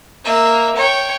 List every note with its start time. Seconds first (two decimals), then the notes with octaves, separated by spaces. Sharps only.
0.24 A#3 E5
0.76 C#5 G5